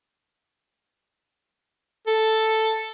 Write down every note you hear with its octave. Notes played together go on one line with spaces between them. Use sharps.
A4